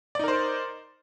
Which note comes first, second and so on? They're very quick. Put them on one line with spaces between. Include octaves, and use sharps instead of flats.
D5 D#4 A#4 C5